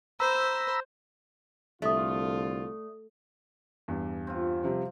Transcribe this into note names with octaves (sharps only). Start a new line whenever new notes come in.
C5 A#5 B5 E6
C2 D3 A3 F4 D5 D#6
E2 G2
C4 F4
C3 F3 G3